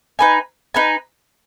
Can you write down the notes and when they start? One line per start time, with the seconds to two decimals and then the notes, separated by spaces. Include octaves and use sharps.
0.19 D#4 B4 G#5
0.74 D#4 B4 G#5